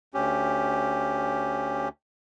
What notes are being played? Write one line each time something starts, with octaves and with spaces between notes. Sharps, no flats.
D2 C#4 G4